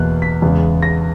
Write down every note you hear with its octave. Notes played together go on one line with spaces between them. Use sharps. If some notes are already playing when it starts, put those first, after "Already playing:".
Already playing: E2 B2 A#3 F#6
B6
E2 C#3 G#3
A#6